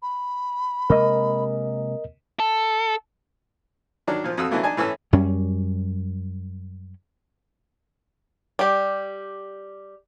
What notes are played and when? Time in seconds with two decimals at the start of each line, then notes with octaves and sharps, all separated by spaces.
0.02 B5
0.90 C3 G#3 A#3 A#4 D#5
2.40 A4
4.07 D#3 F#3 D4
4.24 A#2 F3
4.38 F2 F#4 F5 D#6 E6
4.51 D3 E3 F#3 A3 A#3
4.63 D4 D#4 G#5 A5
4.77 A2 E3 C#4 E6
5.13 F#2 G3 C#4
8.59 G3 G4